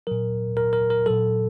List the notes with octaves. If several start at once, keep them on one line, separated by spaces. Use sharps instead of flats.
A#2 F#3 A#4
A#4
A#4
A#4
A#2 F#3 A4